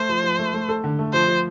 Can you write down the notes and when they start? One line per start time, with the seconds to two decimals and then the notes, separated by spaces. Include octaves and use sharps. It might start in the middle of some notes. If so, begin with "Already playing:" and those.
Already playing: A3 C5
0.09 F3
0.24 F3
0.39 A3
0.54 A3
0.69 A4
0.84 D3
0.99 A3
1.13 F3 C5
1.28 F3